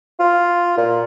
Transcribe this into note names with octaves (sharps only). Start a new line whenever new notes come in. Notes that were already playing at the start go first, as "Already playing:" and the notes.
F4
A#2